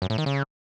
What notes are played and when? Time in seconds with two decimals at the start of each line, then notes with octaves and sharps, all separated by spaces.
0.02 F#2
0.10 A2
0.18 D#3
0.26 C#3